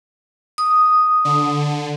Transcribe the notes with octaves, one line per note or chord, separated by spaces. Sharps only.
D#6
D3